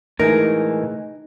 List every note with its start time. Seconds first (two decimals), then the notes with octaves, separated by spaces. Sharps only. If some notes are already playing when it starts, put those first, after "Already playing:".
0.19 A2 E3 G#3 D#4 A#4